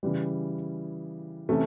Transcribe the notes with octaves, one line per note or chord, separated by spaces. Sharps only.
C#3 E3 G3
C3 E3 A3 C#4